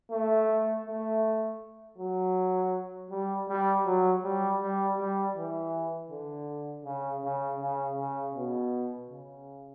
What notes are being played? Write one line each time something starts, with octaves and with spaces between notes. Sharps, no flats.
A3
A3
F#3
G3
G3
F#3
G3
G3
G3
E3
D3
C#3
C#3
C#3
C#3
B2
C#3